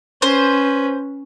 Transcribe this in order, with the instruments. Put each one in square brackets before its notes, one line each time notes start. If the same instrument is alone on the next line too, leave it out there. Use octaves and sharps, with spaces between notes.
[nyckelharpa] C#4 B4 [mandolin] C5